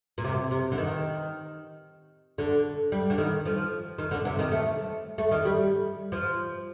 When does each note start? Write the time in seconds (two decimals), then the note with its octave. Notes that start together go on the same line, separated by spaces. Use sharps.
0.18 A#2
0.24 C3
0.51 C3
0.72 D3
0.78 D#3
2.38 D3
2.92 G3
3.10 D3
3.18 D#3
3.45 F3
3.98 D#3
4.11 D3
4.25 C3
4.39 D#3
4.52 A3
5.18 A3
5.31 D#3
5.45 G3
6.12 F3